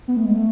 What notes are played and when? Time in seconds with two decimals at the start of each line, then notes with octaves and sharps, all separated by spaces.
0.08 B3
0.17 A3
0.25 G#3
0.33 A3